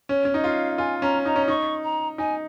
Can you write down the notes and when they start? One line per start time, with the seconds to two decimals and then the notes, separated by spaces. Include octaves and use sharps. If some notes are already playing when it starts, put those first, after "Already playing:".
0.09 C#4 C#5
0.25 C#4
0.34 D#4
0.44 F4 F5
0.78 F4 G#5
1.02 C#4 A#5
1.25 D#4 A#5
1.36 C#4
1.48 D#4 C#6
1.84 A#5
2.18 D#4 G#5